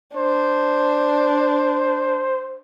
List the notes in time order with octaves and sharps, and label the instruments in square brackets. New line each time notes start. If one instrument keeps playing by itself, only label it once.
[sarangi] D4 [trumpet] C5